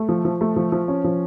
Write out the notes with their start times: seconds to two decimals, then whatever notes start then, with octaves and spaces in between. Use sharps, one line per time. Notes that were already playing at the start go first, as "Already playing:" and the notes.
Already playing: A3
0.09 F3
0.25 F3
0.41 A3
0.56 F3
0.72 F3
0.88 C#4
1.04 F3